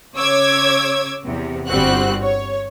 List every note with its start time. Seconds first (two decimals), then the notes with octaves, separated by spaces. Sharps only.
0.15 C#3 C#5 D6 E6 G#6
1.25 E2 C3
1.68 G1 G2 G3 C4 F#4 F#6
2.22 C#5